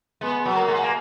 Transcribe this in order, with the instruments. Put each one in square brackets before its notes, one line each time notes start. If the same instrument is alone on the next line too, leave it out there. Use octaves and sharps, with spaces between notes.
[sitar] G#3 [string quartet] B3
[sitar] F#3
[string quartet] A#3
[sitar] G#3
A#3